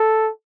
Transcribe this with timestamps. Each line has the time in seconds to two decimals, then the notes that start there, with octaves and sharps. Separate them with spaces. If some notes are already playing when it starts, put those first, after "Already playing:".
Already playing: A4